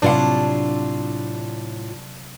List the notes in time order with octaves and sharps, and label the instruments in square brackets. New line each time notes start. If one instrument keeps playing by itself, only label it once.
[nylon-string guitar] A2 F4 F#5 [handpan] C3 F#3 D5 [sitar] D4